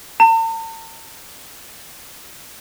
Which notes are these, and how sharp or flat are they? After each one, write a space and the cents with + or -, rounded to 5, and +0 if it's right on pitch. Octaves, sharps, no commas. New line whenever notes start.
A5 +45